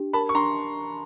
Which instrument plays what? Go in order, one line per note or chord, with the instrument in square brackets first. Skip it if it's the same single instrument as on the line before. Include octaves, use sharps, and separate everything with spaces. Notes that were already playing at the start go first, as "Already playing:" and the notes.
Already playing: [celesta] D4 G4
[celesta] A#4 [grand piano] A5 B5
[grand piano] C#6
[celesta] D4 [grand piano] A#5 C6